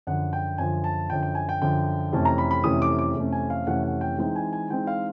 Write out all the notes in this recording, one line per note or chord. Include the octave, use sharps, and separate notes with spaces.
F#2 D3 F3 F#5
G5
F#2 D3 F3 G#5
A5
F#2 D3 F3 G5
G5
G#5
G5
F#2 D3 F3 G5
F2 C3 E3 A3 C#4 A5
A#5
B5
B5
F2 C3 E3 A3 C#4 D#6
D6
D6
F2 C3 E3 A3 C#4
G#5
F5
F2 C3 E3 A3 C#4 F#5
F#5
G5
E3 G#3 C4 D#4 G5
G#5
G#5
E3 G#3 C4 D#4 G5
F5